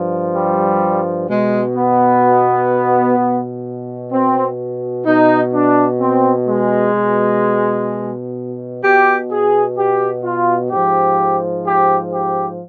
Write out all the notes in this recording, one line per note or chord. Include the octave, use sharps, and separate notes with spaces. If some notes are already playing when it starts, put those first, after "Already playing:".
Already playing: G2 F3
G3
B2 G#3
B3
B2
C4
B2 D#4
D4
C4
G#3
B2
B2 G4
G#4
G4
F4
G#2 F3 G4
G4
G4